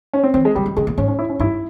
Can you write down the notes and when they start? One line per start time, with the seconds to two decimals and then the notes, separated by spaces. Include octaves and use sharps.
0.13 C#4
0.23 C4
0.34 E3 C4
0.45 G#3
0.55 C#3 G3
0.66 E3
0.77 C#3 G#3
0.87 A#2
0.98 G#2 C#4
1.08 C#4
1.19 E4
1.29 C#4
1.40 G2 E4